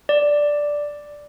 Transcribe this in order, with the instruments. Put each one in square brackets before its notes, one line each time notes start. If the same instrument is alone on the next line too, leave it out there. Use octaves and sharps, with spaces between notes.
[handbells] D5